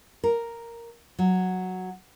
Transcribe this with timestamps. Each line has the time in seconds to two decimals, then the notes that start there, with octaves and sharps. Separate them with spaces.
0.24 A#4
1.19 F#3